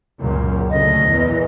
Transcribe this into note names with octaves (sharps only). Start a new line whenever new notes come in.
C#2 F#2 A#2
D2 C#3 A3 D#5
E2 A#2 E3